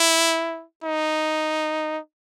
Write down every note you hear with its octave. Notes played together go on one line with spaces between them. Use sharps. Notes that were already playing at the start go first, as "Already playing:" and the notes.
Already playing: E4
D#4